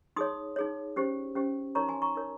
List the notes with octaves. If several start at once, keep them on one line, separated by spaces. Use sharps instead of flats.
D#4 G#4 C#5 C6 D#6
D#4 G#4 C#5
C#4 G4 C5
C#4 G4 C5
D#4 A#4 C#5 A#5 C#6
G#5 C6
A#5 C#6
D#4 A#4 C#5